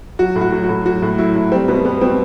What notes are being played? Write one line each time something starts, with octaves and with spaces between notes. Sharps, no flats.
F#3 F#4
A2
F#4
F#3
F#4
A2
F#3 F#4
A2
F#3 E4
A2
G3 C4
B2 B3
G3 B3
B2 C4